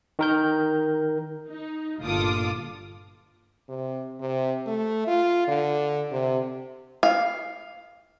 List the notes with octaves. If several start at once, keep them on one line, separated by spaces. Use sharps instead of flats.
D#3 A#4 G6
D#4
G1 A#2 F4 A4 D6 D#6
C3
C3
A3
F4
D3
C3
F5